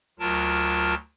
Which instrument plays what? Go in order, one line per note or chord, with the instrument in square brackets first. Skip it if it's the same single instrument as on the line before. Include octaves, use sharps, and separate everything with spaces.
[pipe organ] D2 F#3 F4 A#4 A5